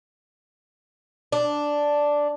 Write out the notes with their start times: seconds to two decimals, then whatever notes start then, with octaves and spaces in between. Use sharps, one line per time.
1.32 D4